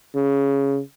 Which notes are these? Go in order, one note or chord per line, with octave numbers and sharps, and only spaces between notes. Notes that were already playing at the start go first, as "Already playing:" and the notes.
C#3